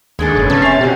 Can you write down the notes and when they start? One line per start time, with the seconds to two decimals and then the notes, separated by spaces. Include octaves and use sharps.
0.19 D#2 G#3 D4 G#4 A4
0.36 F1 B1 C#3 B4
0.50 A3 C#4 A5
0.62 C3 E5 A6 C7 F7
0.81 B2 C4 C#4 F#4 G4